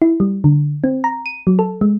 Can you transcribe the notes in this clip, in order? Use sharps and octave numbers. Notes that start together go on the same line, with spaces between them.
E4
G3
D3
C4
A#5
D#7
F#3
A4
G#3